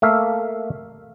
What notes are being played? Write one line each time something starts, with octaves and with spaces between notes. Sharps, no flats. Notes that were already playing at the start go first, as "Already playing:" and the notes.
A3 A#3 E5 F5